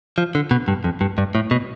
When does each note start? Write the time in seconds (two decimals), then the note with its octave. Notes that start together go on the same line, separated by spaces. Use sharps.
0.18 F3
0.35 D3
0.51 B2
0.68 G2
0.84 F2
1.01 G2
1.18 G2
1.35 A2
1.51 B2